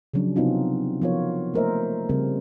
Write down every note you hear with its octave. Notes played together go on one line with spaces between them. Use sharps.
C#3 F3 F#3 C#4 D4
C3 B3 C4 D#4 F4 F#4
F3 B3 F4 A#4 C#5
A3 A#3 A#4 C5 D#5 E5
C#3 G3 C4 A#4